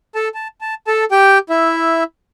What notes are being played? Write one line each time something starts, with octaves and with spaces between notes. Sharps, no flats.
A4 A5
A5
A5
A4 A5
G4 G5
E4 E5